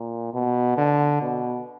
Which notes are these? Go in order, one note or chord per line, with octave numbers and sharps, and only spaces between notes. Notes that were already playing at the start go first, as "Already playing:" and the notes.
Already playing: A#2
B2
D3
B2